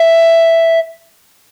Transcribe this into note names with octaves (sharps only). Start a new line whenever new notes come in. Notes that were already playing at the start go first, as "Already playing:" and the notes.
Already playing: E5